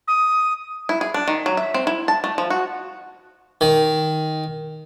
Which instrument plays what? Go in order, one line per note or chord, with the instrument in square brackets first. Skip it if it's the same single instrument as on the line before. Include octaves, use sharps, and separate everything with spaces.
[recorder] D#6
[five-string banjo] E4
G#4
D4
D#3
F#3
E5
C4
E4
A5
A3
F3
F#4
[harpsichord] D#3